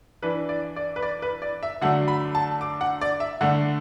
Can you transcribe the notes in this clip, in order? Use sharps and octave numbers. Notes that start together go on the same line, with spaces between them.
E3 D4 B4
D5
D5
B4
D5
B4
D5
E5
D3 F#3 A3 D4 F#5
B5
A5
D6
F#5
D5
E5
D3 A3 D4 F#5